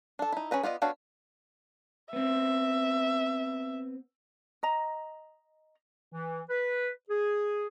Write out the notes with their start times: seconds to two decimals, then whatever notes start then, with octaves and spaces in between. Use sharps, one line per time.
0.19 D4 A4
0.32 D#4 E4
0.51 C#4 G#4 B4 A#5
0.63 B3 F4 D5 D#5
0.82 B3 D4 F#4 C#5 F5
2.13 B3 C4 E5
4.63 D#5 A#5
6.13 E3
6.49 B4
7.09 G#4